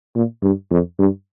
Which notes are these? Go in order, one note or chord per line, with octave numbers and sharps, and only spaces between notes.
A#2
G2
F2
G2